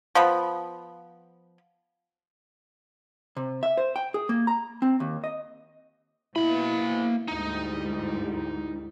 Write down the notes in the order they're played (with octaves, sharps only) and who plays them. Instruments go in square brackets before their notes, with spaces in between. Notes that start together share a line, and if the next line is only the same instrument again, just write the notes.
[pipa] F3 B3 B5
[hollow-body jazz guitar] C3
E5
C5
G5
G#4
A#3
A#5
C4
D#2
D#5
[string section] B2 [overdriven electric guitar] A#3 B5 [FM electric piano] E4
[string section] D2 G#2 G3 [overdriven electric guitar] D#4